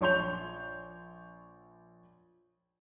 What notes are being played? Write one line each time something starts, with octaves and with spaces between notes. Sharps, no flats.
A#1 C#5 C6 G6 F7